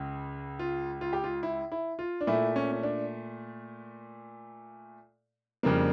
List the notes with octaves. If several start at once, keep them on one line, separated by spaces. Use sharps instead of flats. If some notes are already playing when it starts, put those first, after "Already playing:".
Already playing: C#2 C#3
F4
F4
G4
F4
E4
E4
F4
D4
A#2 A3 E4
C#4
C#4
D4
F2 C#3 G3 A#3 D4